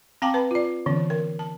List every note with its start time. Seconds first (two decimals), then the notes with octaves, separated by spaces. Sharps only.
0.22 C4 F5 G5 A5 A#5 D6
0.34 B4 A5 B5
0.51 F4 D5
0.86 D3 E3 B3 C#4
1.10 A#4
1.39 A5